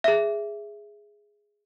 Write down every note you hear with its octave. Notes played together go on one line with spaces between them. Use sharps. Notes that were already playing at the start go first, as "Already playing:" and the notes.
G#4 E5